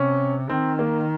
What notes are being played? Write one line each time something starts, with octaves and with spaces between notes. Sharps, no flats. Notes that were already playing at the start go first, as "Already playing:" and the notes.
Already playing: C3 C#4
D#3 C4
A#3